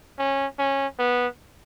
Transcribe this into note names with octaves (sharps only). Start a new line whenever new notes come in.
C#4
C#4
B3